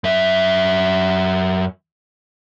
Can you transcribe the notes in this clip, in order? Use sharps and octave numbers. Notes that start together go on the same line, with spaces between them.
F#2 E5